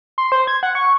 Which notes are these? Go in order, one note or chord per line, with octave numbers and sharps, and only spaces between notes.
C6
C5
G#6
F#5
C#6